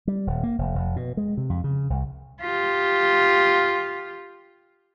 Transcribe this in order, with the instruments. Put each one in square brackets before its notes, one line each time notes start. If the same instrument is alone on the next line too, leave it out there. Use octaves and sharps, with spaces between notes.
[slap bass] G3
D#1
A#3
F1
F1
B2
G#3
C3
F2
C#3
C2
[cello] F4 G4